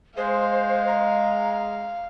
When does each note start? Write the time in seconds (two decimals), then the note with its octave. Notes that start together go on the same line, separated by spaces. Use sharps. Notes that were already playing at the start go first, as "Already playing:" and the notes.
0.17 G#3 C5 F5
0.87 A#5